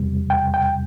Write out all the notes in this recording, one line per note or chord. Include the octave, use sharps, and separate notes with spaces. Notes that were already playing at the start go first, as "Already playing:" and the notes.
Already playing: E2 C3 G3
G5
G5